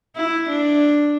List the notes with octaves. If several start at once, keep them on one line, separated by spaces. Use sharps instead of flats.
E4
D4